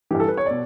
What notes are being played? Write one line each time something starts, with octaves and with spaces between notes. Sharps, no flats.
G2 E3 G4
A4
B4
C#5
B2 D5